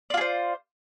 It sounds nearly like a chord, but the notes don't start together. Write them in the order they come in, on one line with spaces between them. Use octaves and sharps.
D5 F4 G#4 C5